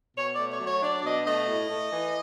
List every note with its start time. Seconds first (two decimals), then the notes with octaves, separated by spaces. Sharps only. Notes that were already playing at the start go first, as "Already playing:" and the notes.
0.17 B2 C#5
0.33 D5
0.39 A3
0.50 C#5
0.60 F#3
0.66 C#5
0.82 D4 D5
1.00 D5
1.04 B2 D#5
1.26 A3 D#5
1.48 A2
1.70 A3
1.92 E3